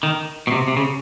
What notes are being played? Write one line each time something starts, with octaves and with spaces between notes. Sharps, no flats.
D#3
B2
C3
C3
C#3